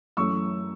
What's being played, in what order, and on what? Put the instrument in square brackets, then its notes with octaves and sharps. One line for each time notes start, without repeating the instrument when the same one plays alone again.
[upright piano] F#2 E3 A3 C#4 C#6 E6